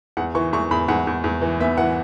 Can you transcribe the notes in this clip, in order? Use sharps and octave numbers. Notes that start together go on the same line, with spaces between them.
E2 F#5
E3 C#6
E2 C#6
E2 B5
E2 F#5
E2
E2
E3
B3 E5
E3 F#5